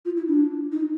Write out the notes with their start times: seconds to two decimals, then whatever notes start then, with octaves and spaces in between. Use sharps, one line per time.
0.05 F4
0.16 E4
0.27 D4
0.72 D#4